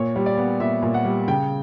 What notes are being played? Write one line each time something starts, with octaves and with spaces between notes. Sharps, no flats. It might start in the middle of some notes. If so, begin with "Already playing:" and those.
Already playing: A#2 C#5
G3
D5
B3
A#2 E5
A#2
F#5
G3
C#3 G5